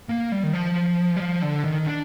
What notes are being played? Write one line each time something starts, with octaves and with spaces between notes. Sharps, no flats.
A#3
G3
D#3
F3
G3
F3
D3
D#3
D4